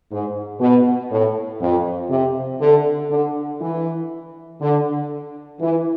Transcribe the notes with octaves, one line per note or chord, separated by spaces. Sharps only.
G#2
B2
A2
F2
C3
D3
D3
E3
D3
E3